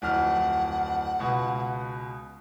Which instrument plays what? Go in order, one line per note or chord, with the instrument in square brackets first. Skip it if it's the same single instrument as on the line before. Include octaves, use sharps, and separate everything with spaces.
[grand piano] D1 F2 F6 [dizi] F#5
[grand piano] C#2 B2